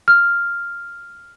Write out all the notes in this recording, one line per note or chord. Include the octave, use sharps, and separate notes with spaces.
F6